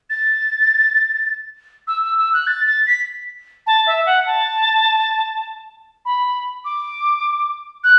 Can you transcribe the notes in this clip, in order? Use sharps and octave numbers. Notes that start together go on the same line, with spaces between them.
A6
E6
E6
E6
F#6
A6
A6
B6
A5
E5
F#5
A5
B5
D6
F#6